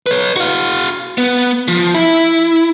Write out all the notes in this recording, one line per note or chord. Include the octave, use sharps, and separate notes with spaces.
B4 C#5
F#4 F5
B3
F3
E4